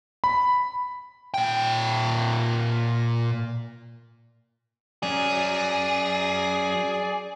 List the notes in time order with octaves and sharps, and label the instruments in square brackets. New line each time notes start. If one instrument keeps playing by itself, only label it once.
[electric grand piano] B5
[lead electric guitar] A#2 G5
[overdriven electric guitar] F#3 C#4 [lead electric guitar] G#4 [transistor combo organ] D5